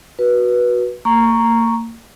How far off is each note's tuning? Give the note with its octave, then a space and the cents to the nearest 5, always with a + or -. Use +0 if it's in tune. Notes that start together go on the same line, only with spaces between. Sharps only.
F#4 +0 B4 -20
A#3 -35 A#5 +0 C#6 +0